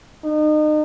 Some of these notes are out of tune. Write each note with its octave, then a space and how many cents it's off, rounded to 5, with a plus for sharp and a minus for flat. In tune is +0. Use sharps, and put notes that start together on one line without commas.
D#4 -35